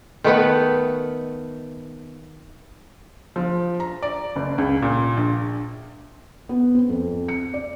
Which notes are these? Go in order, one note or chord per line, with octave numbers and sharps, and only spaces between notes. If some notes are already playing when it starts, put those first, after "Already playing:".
D#3 A3 B3 B4
F3
A#5
D5
F#1
C#2
A#2
A#1
B3
C4
F2
C#7
D5